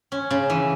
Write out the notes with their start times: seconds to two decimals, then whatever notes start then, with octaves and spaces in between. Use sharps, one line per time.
0.12 C#4
0.31 C#3
0.50 E3